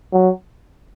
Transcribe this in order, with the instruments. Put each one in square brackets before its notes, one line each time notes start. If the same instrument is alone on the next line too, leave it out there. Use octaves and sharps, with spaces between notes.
[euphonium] F#3